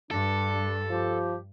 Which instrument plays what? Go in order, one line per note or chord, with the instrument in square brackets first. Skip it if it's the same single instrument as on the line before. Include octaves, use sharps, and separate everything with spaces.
[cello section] G2 [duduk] D4 [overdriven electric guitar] A4
[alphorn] F3 [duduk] G4